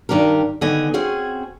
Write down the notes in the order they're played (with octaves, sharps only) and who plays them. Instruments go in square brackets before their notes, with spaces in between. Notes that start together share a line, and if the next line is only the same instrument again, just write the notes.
[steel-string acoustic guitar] G2 D#3 D4 G4 A#4
D3 D#3 B3 D#5 G#5
C4 C#4 F#4 G#4